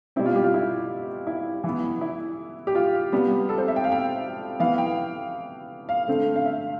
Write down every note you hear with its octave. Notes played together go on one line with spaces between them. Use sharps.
B2 G3 C4 E4
F4
G4
F4
E4
E4
E3
B3
E4
G4
F4
C3 G3 B3
A4
C5
E5
G5
F5
G5
E3 B3 F5
G5
F5
D3 A3 C4
F5
E5